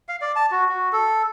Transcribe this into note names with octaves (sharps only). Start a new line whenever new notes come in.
F5
D5
A5
F#4
F#4
A4